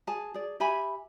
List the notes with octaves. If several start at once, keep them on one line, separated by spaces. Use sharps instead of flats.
G#4 G#5 A5
G#4 D5
G4 E5 G#5 B5